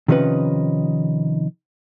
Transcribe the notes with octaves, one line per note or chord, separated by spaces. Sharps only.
C3 D#3 F3 C#4 D#4 B4